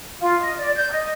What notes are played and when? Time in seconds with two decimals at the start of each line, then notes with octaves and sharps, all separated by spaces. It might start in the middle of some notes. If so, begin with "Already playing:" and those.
0.18 F4
0.38 D#5
0.58 D5
0.74 G6
0.90 D#5